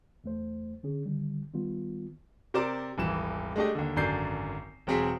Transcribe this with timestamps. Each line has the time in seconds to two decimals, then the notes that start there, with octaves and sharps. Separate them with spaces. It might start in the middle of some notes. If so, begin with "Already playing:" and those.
0.24 E2 A3 C5
0.83 D3 C#4 G#4
1.06 D3 D#3 G3
1.53 D#3 G3 B3 F4
2.54 C3 A#4 C5 D5 D6 E7
2.98 D#1 G#1 E3 E7
3.56 G#3 A3 D4 G4 D#5
3.75 D#2 D3
3.96 G#1 F#2 D3 D5 G6 C7
4.87 E1 F#3 C4 G#4 B6